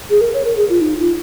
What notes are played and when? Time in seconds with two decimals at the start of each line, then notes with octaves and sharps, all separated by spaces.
0.10 G#4
0.21 A#4
0.34 C#5
0.45 A#4
0.57 G#4
0.70 F4
0.81 D#4
0.99 F4